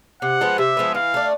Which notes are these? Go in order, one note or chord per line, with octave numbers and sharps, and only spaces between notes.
C3 F#5
F3 G#3 B3
C3 E5
F3 G#3 B3
E3 F5
A3 D4